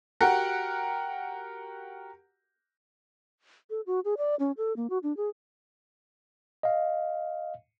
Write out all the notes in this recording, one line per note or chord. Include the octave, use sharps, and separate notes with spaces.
F#4 G4 A#4 F#5
A4
F#4
G#4
D5
C#4
A4
A#3
F#4
D4
G#4
D#5 F5